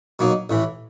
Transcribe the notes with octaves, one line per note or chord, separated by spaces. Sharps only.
B2 F#3 A#3 D#4
A1 A2 E3